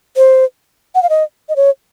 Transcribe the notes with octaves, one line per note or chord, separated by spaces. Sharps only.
C5
F#5
F5
D#5
D#5
C#5